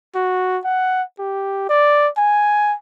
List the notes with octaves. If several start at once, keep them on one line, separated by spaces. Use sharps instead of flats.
F#4
F#5
G4
D5
G#5